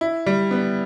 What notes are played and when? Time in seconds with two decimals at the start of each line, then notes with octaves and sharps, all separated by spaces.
0.01 E4
0.26 G3
0.51 B3